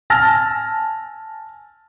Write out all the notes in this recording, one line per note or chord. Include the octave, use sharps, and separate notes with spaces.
G#5 A5 E6 F6 A6 A#6